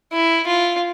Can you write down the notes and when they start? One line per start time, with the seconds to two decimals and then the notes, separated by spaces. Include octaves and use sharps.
0.13 E4
0.47 F4